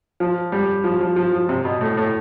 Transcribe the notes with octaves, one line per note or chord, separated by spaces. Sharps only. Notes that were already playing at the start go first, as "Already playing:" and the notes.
F3
G3
F3
F3
F3
F3
C3
B2
A2
A2